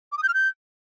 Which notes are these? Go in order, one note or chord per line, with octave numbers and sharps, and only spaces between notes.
D6
D#6
G6
F6
G6